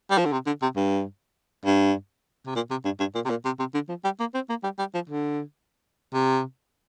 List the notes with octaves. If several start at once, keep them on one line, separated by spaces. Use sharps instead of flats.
G3
F3
D3
C3
D3
C3
G2
G2
C3
A#2
C3
G2
G2
A#2
C3
A#2
C3
C3
D3
F3
G3
A#3
C4
A#3
G3
G3
F3
D3
C3